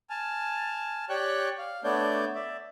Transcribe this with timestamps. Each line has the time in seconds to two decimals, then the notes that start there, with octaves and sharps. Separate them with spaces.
0.10 G#5 A5 F6
1.09 G4 C#5 D5 G5 C#6 F#6
1.58 F5
1.84 A3 B3 D4 C#5 D5 G6
2.35 D5 E5